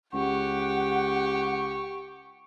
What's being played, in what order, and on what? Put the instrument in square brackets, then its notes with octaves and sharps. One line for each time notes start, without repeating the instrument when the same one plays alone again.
[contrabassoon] C#2 [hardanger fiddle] G4 [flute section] F#5 [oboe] C#6